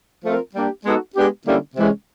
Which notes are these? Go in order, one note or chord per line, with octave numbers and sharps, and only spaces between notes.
F3 A3 C4 F4 A#4
G3 A#3 D4 G4
G#3 B3 D#4 F#4 A4
G#3 B3 D4 G4
D3 G3 A#3 C#4 E4
C3 E3 G#3 C#4